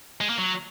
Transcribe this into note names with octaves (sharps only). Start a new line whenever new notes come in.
G#3
A#3
F#3